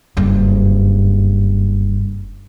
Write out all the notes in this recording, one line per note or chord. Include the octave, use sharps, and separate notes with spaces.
F#1 G2